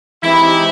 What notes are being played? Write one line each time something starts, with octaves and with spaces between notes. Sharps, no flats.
E3 G#3 C4 D#4 E4 G4
D#4 G4